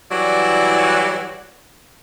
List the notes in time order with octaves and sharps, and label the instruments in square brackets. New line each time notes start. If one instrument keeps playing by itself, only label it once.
[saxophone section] E3 F#3 G3 E4 F#4 D5